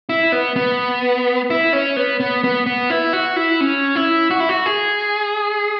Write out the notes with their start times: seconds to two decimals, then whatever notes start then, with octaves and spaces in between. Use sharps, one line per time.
0.09 E4
0.32 B3
0.56 B3
1.50 E4
1.73 C#4
1.96 B3
2.20 B3
2.44 B3
2.66 B3
2.90 E4
3.13 F#4
3.36 E4
3.61 C#4
3.96 E4
4.30 F#4
4.40 E4
4.49 F#4
4.66 G#4